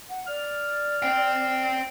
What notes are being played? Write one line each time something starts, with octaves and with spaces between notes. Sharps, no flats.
F#5
D5 F6
C5 G5